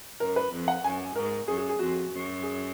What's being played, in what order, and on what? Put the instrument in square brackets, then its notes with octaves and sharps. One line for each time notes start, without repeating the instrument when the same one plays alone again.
[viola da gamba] F#2 [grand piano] A#4
[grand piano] B4
[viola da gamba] F2
[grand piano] F#5
[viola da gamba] F#2 [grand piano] G#5
[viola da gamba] G#2 [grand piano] A#4
[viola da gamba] F#2 [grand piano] G#4
[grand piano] G#4
G#4
[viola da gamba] F2 [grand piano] F#4
[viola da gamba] F#2
[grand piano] G#4